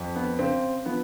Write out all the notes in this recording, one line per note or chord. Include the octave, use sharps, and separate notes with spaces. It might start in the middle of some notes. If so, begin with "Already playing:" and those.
Already playing: F2
B3
C#3 C4
F3 B3